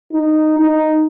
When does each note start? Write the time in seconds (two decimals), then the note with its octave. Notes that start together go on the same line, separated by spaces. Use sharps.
0.13 D#4
0.60 D#4